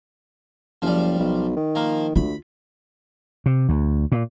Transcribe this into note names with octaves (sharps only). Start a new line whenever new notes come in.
F#1 F3 G3
B1
D#3
F3 A#3
D2 F4 B5
C3
D2
A#2